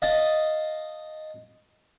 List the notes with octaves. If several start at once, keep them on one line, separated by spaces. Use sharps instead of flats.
D#5 F5 A5